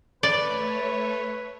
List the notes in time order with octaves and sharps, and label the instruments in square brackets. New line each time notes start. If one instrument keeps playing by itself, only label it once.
[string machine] A3 C#5 [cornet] B4 [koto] D5